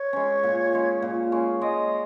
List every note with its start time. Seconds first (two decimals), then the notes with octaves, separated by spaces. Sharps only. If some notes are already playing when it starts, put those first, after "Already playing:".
Already playing: C#5
0.13 G#3 C#4
0.43 A#2
0.73 G#3 C#4
1.02 A#2
1.32 G#3 C#4
1.61 G#3 D#5